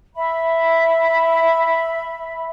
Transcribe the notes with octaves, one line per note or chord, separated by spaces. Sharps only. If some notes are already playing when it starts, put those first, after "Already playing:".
E5 B5